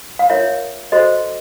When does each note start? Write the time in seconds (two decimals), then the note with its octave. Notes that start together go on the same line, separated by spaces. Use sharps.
0.19 F5
0.30 F4 A#4 C#5 E5
0.92 F#4 A4 C5 D#5